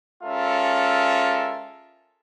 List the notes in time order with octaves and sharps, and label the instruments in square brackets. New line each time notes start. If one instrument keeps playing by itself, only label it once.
[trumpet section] G#3 C#4 F4 A4 A#4 E5